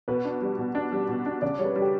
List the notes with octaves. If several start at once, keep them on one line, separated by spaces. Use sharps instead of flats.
B2 B4
D4
G3
B2
D4
G3
B2
D4
C#3 D5
G3 C#5
B4
G3
G4